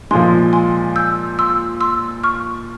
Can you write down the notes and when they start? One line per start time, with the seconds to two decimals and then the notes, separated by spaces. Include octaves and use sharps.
0.11 A#2 F3 G#3 G#5 C6
0.53 G#5 C6
0.96 E6 G6
1.39 C6 E6
1.81 C6 E6
2.23 C#6 F6